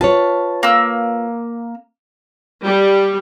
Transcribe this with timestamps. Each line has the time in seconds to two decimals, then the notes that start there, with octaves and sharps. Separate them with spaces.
0.01 F4 B4 C#5 A5
0.63 A#3 E6
2.64 G3